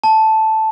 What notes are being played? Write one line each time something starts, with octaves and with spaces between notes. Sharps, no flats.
A5